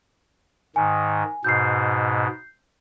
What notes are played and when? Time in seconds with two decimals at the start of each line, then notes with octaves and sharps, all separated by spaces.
0.76 G#2 D#3 G#5
1.44 G#2 B2 G6 C7